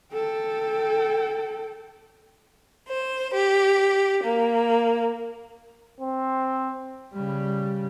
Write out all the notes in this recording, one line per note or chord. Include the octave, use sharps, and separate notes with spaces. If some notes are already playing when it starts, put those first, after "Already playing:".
A4 G5
C5
G4
A#3
C4
C#3 G3